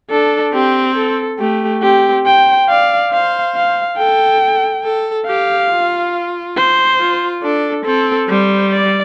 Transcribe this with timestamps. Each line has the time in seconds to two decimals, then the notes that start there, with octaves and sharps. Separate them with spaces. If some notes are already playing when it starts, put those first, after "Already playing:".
0.10 D4 A4
0.53 C4 G4
0.96 A4
1.39 A3 G4
1.82 C4 G4
2.25 C5 G5
2.69 D5 F5
3.12 C5 F5
3.55 F5
3.98 A4 G5
4.84 A4
5.27 G4 F5
5.70 F4
6.57 C5
6.99 F4
7.43 D4 A4
7.85 C4 A4
8.29 G3 C5
8.73 D5